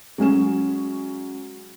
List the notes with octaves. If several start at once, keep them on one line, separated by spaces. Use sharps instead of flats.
F#3 G#3 C#4 E7